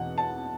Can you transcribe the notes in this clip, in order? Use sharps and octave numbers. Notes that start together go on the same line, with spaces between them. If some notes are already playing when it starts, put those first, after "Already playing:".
Already playing: E2 B2 F#5
A5